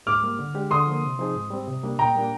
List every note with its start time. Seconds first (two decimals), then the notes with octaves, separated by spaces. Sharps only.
0.06 G#2 D6 F6
0.23 G3 A#3
0.39 D3
0.55 G#3 D4 G4
0.71 D3 C6 D#6
0.87 F3 A#3
1.03 C3
1.19 F3 C4 D#4 G#4
1.35 G#2
1.50 G3 C4
1.67 C3
1.83 G3 A#3 D4
1.99 A#2 G5 A#5
2.15 G3 A#3 D4